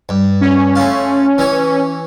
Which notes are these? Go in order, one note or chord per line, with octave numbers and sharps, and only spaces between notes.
G2
C#4
A3 F4
E3 C#5